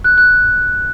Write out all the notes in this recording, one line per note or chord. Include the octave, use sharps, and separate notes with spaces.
F#6
F#6